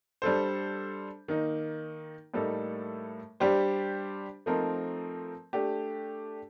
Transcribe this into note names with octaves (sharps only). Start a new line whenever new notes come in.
G3 D4 A4 C5
D#3 A#3 D#4
A2 G3 A#3 D#4 A4
G3 D4 G4 C5
F3 A3 C4 D#4 A#4
A3 D4 G4